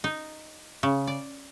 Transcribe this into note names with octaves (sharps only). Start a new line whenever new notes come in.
D#4
C#3
D5